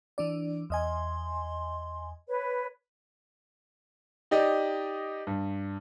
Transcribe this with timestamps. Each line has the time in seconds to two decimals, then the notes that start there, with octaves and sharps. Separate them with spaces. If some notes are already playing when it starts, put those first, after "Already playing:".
0.18 E3 D4 D5
0.70 E2 D#5 G#5 C6
2.27 B4 C#5
4.31 D#4 G4 D5 D#5
5.27 G2